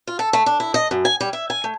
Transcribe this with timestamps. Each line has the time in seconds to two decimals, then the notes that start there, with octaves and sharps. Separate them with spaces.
0.07 F4
0.19 A4
0.33 A3
0.46 D4
0.60 E4
0.74 D#5
0.91 F#2
1.05 G#5
1.20 G3
1.33 E5
1.50 G#5
1.64 A3